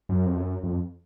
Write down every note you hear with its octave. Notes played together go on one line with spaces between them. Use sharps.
F#2
F2
F#2
F2